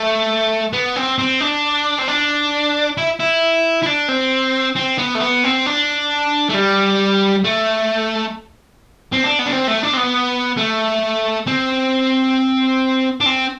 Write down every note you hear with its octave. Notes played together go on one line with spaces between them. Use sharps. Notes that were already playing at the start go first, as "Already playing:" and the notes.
Already playing: A3
B3
C4
C4
D4
C4
D4
E4
E4
E4
D4
C4
C4
B3
A3
B3
C4
D4
A3
G3
A3
C4
D4
B3
D4
C4
A3
D4
C4
B3
A3
C4
D4
C4